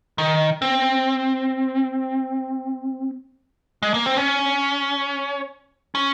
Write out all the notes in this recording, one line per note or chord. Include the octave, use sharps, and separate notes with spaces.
D#3
C4
G#3
A#3
C4
C#4
C#4